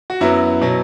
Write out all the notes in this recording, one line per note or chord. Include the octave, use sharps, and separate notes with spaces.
F#4
F#2 F#3 B3 E4
B2 F#3